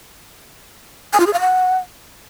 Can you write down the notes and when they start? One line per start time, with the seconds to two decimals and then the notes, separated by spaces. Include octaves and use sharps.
1.13 G#5
1.20 F4
1.27 G#4
1.33 F5
1.40 F#5